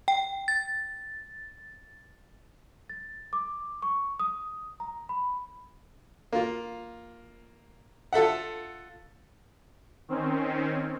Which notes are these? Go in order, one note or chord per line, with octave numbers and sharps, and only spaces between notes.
G5
A6
A6
D6
C#6
D#6
A#5
B5
A#3 F4
F4 A4 E5 F#5
D#3 C4 C#4